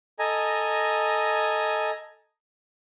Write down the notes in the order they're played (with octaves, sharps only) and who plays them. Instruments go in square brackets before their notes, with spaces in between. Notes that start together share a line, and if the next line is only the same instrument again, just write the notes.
[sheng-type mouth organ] A4 D#5 G#5 A#5